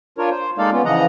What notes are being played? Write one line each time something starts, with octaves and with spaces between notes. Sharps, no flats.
D4 F4 A#4 C#5
C5
G#3 A#3 D#4 A4 D5 F5
B3 C#4 F4
C#3 E3 F3 D#5 F#5 A#5